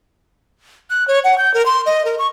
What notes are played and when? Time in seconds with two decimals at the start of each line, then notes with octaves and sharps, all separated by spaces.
0.90 F#6
1.08 C#5
1.24 F#5
1.38 G6
1.54 A#4
1.66 C6
1.86 D#5
2.05 A#4
2.19 C#6